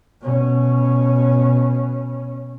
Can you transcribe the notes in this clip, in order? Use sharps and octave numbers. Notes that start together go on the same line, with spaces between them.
B2 C#4